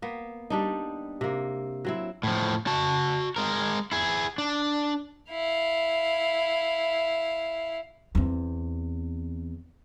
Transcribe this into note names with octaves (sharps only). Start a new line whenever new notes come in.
A#3 B3
G3 D4 D#4
C3 A#3
F#3 C4 E4
A2 F3
F#4 A5
G#3 A#4
E4 G#4
D4
E4 F5
E2 C4